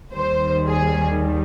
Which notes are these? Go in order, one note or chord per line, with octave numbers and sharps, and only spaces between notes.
D#2 D#3 G3 C5
G#4